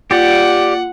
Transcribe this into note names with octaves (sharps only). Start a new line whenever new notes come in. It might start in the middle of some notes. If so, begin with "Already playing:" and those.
A#3 F4 G4 D5 F#5 C#7